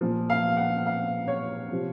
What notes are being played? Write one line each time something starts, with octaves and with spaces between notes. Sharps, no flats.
A#2 F3
F5
F#5
F5
C#5
C3 F3